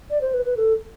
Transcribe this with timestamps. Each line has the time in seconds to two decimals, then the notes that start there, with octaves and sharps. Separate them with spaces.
0.10 D5
0.21 C5
0.34 B4
0.45 B4
0.57 A4